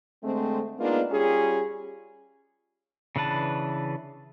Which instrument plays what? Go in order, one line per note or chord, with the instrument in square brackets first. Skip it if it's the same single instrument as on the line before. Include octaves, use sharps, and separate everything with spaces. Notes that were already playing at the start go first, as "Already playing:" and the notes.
[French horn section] D3 G#3 A3 C4
G#3 A#3 B3 D4 D#4 F4
G3 C#4 F4 G4 G#4
[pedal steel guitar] C#3 E3 D4 B4 A5